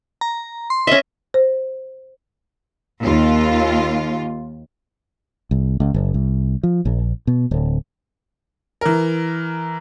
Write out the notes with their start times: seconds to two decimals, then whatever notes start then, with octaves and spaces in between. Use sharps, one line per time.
0.21 A#5
0.70 C6
0.87 C#4 D#5 E5
1.34 C5
3.03 D#2 F4
5.51 C2
5.80 C#2
5.94 F#1
6.14 C2
6.63 F3
6.85 A#1
7.27 B2
7.51 D1
8.81 E3 A#4